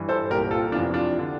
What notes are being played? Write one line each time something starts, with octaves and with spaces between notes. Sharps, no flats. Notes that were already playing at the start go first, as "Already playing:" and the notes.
Already playing: G2 E3
A4 C5
C2 A#2 G4 A#4
F4 A4
F2 C3 E3 D4 F4
D4 F4
D3